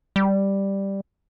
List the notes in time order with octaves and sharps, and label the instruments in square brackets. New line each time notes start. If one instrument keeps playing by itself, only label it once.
[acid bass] G3